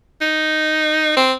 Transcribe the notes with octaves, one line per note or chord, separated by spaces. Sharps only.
D#4
C4